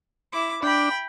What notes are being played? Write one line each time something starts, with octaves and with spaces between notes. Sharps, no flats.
E4 D6
D4 G5 B5